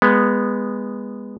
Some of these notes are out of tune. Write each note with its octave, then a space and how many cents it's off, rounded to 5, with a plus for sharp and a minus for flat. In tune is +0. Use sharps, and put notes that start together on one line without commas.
G#3 -15 B3 -5